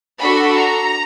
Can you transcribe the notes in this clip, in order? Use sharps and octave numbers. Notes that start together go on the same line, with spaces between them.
D4 F#4 A4 B5
A#5